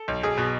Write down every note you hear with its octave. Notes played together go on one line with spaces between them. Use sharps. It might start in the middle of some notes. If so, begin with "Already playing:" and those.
Already playing: A4
B1
B1 G#4
B2